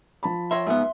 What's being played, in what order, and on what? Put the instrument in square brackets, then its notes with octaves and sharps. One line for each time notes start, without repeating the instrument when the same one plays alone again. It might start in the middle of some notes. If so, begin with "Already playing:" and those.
[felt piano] F3 A5 B5
[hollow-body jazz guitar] C#5 E5 [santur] C6
[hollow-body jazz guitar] G#2 B3 [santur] E5